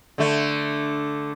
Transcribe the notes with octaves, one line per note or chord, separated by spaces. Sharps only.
D3 A3